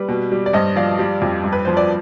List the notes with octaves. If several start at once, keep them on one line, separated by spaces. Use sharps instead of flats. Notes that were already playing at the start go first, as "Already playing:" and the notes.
Already playing: G3 B4
B2
G3
D5
G2 C5 D#5
F3 D5 F5
G3
F2
G2
B4
F3 C5
D5